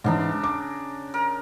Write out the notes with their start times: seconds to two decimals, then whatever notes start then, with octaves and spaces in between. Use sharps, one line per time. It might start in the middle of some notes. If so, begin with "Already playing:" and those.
0.04 G#2 C#3 E3 D4 A#5
0.43 D6
1.14 A#4